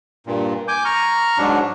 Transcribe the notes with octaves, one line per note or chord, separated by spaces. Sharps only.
G2 A#2
G#5 D6 G6
A#5 C#6 F6
G#2 F#3 D4